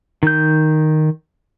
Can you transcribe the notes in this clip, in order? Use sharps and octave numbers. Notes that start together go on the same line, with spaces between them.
D#3 G6